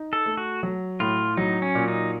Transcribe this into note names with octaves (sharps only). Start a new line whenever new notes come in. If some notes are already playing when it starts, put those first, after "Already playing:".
Already playing: D#4
A4
A3
F#4
F#3
A2 F4
F#3 D#4
C#4
A#2
D#4